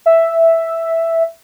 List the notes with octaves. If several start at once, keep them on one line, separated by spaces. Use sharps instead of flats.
E5